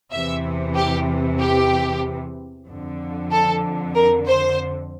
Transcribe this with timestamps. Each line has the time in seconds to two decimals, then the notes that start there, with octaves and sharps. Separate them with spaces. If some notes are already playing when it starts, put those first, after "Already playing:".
0.11 E2 C3 E3 E5
0.75 G4
1.39 G4
2.67 F2 D3
3.31 A4
3.95 A#4
4.27 C5